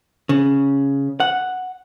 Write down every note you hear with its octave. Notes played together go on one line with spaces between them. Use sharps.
C#3
F#5